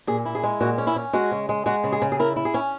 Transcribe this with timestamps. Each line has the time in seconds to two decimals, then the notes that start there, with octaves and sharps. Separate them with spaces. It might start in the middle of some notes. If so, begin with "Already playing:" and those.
0.07 A#2 G#4
0.25 E4
0.35 G#4
0.43 G#3
0.61 A#2 F#4
0.78 C#4
0.87 E4
0.96 C#4
1.13 G#3 F#4
1.31 C#3
1.49 G#3
1.66 G#3 F#4
1.84 C#3
1.92 G#4
2.02 C#3
2.12 G#4
2.19 E4 A#4
2.36 E4
2.45 G#4
2.54 C#4